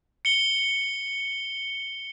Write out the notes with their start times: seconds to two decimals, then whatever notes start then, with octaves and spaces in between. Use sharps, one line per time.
0.25 C#7 G7